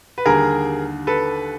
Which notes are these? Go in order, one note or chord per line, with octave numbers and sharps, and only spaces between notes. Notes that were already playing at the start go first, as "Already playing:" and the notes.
B4
D#2 D3 G3 G#4 A#4
A4 B4